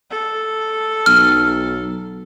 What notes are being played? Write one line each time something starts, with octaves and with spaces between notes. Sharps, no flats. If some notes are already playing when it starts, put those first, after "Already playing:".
A4
B1 F6